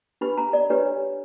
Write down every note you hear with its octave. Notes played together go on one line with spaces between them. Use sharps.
D4 G4 B4 B5
A#5
D5
D4 G4 B4 C#5